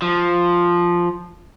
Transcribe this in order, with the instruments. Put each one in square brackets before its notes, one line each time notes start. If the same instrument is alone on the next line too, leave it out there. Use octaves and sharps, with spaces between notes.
[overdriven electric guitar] F3